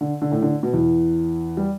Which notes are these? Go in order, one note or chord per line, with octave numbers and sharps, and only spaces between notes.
D3
D3
A2 A3
D3
B2
E2 E3
G3